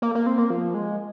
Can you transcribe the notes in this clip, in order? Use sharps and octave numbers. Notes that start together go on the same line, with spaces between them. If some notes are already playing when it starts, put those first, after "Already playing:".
A#3
A#3
C4
A#3
F3
G#3